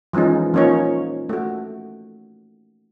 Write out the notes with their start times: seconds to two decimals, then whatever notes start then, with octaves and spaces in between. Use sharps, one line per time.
0.13 E3 F3 G#3 C#4 D#4
0.54 F3 A#3 C#4 D#4 C#5
1.29 A3 F#4